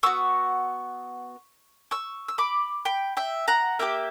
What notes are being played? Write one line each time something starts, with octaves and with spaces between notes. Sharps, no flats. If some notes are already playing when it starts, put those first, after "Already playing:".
B3 F#4 C#6 E6
C#6 E6
E6
B5 D6
G5 B5
E5 G5
F#5 A#5
A#3 E4 G4 E5 G5